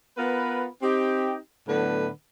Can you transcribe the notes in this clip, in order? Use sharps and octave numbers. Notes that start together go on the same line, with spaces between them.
B3 F4 A#4 B4
C4 D#4 G4
A2 D3 F#3 B3 B4